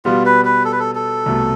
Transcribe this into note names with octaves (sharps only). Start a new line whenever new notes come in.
B2 G3 B3 F4
B4
B4
A4
B4
A4
A4
C2 B2 A3